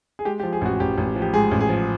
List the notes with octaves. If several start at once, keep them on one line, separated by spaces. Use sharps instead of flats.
G#4
G#3 G4
G4
F3
G#4
A1 F#4
A1 G4
A1
F3
G4
G#2 G#4
A1
G#4
F3